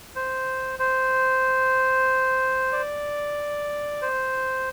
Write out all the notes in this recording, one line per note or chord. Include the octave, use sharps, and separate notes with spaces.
C5
C5
D5
C5